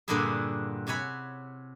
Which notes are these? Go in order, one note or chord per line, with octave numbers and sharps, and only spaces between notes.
G2 A#2 D3 D4 E4 G#4
C3 C#5 F#5 G#5 B5